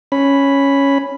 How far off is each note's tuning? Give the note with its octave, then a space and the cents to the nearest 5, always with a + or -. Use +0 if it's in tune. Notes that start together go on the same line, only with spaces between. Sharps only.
C#4 +0 B5 +0